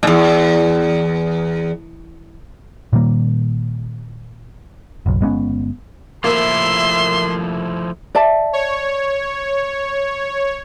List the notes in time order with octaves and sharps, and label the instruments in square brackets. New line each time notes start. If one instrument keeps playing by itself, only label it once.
[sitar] E2 A#2
[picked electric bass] A#2 D#3 G3 A#3
F#1 B1
G1 G#3 B3 C#4
[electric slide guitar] F3 A3 E4 [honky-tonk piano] A#3 [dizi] E5 [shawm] C6
[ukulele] D5 E5 A5
[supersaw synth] C#5